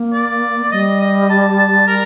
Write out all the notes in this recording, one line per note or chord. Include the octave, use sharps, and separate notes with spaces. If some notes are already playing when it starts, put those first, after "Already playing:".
Already playing: A#3
D5
G3 D#5
D#5
A5
A5
A#4